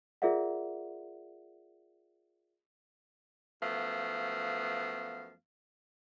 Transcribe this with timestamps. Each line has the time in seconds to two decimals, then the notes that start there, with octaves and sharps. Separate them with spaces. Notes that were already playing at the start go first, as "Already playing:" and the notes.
0.22 F4 G#4 A#4 D5 E5 F#5
3.61 F#2 F3 A3 B3 F5